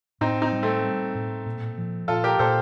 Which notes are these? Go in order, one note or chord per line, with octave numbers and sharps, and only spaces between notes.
A2 C4 D#4
C4 D#4
G3
A3 C4
G3
A2
A#2
F3
A#2 F4 A4
G4 A#4
A#2 A4 C5